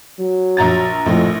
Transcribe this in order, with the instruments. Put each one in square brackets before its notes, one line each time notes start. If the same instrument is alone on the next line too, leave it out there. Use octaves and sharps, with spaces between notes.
[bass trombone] F#3
[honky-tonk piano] A#1 A#5 A6
[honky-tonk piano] A#1 A2 [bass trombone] F2